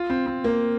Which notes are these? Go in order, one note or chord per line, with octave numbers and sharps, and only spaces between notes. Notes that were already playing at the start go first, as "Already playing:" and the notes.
Already playing: F4
C4
C4
A#3